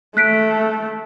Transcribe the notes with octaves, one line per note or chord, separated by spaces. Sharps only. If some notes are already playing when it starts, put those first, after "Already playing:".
A3 F#6 B6 D7